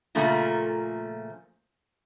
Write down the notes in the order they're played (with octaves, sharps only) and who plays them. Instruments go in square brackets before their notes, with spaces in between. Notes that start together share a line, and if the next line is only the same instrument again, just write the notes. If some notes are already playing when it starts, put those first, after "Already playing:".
[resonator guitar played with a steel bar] A#2 C#3 F3 A3 A#3